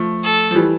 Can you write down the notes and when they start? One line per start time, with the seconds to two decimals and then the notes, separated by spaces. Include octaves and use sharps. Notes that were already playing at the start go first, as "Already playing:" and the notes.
Already playing: F3 A3
0.24 A4
0.51 F3
0.55 E3 G3